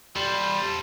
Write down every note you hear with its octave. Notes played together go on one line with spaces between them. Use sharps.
G3 A4 C5